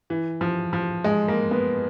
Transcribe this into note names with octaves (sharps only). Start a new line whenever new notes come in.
E3
F3
F3
G#3
A#3
B3